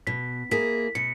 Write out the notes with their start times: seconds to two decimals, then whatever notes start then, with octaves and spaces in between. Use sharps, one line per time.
0.07 B2 B6
0.51 A#3 E4 G#4 B6
0.95 B2 C#7